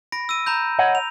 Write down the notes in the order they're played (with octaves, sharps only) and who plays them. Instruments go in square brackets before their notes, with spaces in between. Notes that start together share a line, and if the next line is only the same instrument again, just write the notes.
[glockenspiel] B5 A#6 D7
E6 D#7
A#5 B5 G6
[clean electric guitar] C#5 D#5 F#5
[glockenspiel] F7